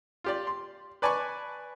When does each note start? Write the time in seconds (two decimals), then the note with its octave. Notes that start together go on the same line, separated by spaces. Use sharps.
0.24 F4 G4 D5
0.47 C6
1.02 B4 D5 G#5 A5 B5 C#6